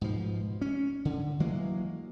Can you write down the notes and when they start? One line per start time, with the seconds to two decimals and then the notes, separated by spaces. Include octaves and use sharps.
0.01 G#2 B2 F3
0.61 C#4
1.05 D3
1.40 E3 F#3 G#3 A#3